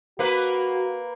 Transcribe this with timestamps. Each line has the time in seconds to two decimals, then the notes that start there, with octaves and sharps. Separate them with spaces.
0.19 A#3 F#4 B4